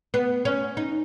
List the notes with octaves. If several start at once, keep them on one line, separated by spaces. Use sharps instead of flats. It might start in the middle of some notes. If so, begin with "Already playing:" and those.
B3
C#4
D#4